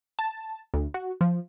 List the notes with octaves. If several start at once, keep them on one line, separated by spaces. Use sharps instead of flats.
A5
D2
F#4
F3